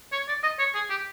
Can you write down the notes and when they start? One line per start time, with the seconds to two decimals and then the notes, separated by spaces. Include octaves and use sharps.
0.12 C#5
0.28 D5
0.43 D#5
0.59 C#5
0.74 G#4
0.90 G4